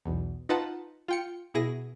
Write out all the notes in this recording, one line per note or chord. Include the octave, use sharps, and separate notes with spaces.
B1 E2
D#4 F4 B4 F#5 A5
F4 G5 C#7
B2 E4 G#4 A#6